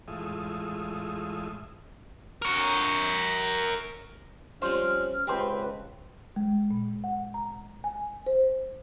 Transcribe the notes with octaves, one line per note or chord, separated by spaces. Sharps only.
E2 A2 G#3 F4 E5 D#6
A#4 C#5
F3 G3 C4 C#4 C5 F6
C#2 C4 G4 B4 C5
G#3
A#2
F#5
A#5
G#5
C5